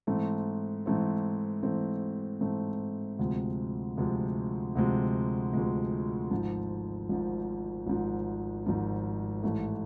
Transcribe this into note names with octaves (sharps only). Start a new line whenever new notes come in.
G#2 E3 A3 C4
G#2 E3 A3 C4
G#2 E3 A3 C4
G#2 E3 A3 C4
D2 C3 F3 G#3
D2 C3 F3 G#3
D2 C3 F3 G#3
D2 C3 F3 G#3
G#1 G#2 F3
G#1 G#2 F3
G#1 G#2 F3
G#1 G#2 F3
A1 G#2 E3 A3